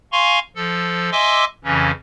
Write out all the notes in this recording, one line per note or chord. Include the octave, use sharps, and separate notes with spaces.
F5 G#5 A#5 C6 C#6
F3 A4
D#5 E5 G#5 C6 D6 E6
F2 C#3 E3 C#4